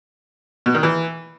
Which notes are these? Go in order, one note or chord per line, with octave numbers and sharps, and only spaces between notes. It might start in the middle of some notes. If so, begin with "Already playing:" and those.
B2
D#3
E3